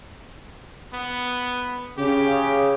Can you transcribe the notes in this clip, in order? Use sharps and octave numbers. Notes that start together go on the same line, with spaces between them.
B3
C#3 G4